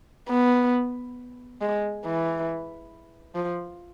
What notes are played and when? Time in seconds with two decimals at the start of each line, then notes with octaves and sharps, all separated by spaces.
0.29 B3
1.61 G#3
2.05 E3
3.36 F3